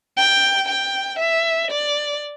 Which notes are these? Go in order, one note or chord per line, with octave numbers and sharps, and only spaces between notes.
G5
G5
E5
D5